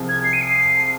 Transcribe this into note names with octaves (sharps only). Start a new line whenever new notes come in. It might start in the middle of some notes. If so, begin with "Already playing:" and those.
Already playing: C2 C3 F3 C4 G#4
G#6
C7
D#7
C7